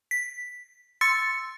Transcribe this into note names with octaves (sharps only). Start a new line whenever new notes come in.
B6
C6 E6 A6 C#7